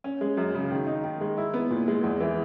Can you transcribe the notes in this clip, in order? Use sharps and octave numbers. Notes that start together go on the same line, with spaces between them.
C#4
G#3
F#2
C#3
D#3
D#4
D#3
G#3
E4
B3
A#2
G#3
E2
E3